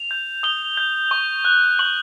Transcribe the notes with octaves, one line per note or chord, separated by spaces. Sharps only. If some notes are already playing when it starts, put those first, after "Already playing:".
Already playing: F7
G6
D#6 G7
G6
C#6
F#6
C#6 F#7